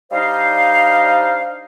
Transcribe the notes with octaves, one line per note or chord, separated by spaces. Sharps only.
G3 D4 D#4 C5 D#5 F5